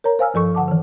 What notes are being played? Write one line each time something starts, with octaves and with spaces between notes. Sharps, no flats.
A#4 C#5 A#5
C5 F5 G#5 E6 F6
G2 F3 A4 C#6
D3 F#5 A5 D6
D#3 E3